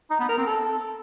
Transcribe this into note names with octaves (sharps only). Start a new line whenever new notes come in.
D#4
B3
A#4
C4
A4